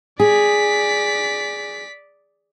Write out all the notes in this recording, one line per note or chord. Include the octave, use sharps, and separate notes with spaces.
G#4 D5 B6